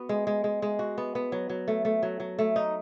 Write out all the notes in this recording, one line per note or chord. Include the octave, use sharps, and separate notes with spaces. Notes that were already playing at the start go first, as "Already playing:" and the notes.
Already playing: B3 F#4
G#3
G#3
G#3
G#3
F#4
B3
B3
F#3
F#3
A3
A3
F#3
F#3
A3
D#4